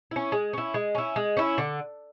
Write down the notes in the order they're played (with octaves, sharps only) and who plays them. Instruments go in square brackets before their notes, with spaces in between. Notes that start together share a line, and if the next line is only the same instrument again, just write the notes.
[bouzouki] C#4 E4
G#3
C#4 E4
G#3
C#4 E4
G#3
C#4 E4
D3